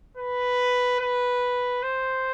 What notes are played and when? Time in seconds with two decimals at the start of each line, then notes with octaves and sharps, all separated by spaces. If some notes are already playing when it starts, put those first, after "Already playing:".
0.17 B4
1.00 B4
1.83 C5